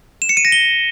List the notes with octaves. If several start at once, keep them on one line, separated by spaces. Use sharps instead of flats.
E7
C#7
D#7
A#6
G7